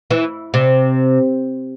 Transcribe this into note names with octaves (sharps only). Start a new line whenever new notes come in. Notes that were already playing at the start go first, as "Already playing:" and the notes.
E3
C3